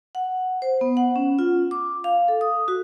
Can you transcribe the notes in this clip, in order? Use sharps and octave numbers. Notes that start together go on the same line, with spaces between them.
F#5
C5
B3
F#5
C#4
F4
D6
F5
A4
D#6
F#4